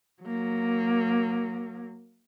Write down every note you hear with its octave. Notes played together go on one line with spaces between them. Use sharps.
F#3 A#3